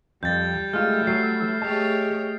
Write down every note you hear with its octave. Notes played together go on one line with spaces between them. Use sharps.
F2 G3 G6 A6
G#3 A3 E4 F4 F6
F#3 C7
A3 G4 G#4 C#5 D#5 A5